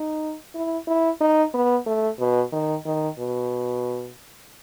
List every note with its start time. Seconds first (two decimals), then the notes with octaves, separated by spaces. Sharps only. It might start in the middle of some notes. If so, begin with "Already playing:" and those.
Already playing: D#4
0.55 E4
0.87 E4
1.21 D#4
1.54 B3
1.86 A3
2.19 B2
2.52 D#3
2.86 D#3
3.19 B2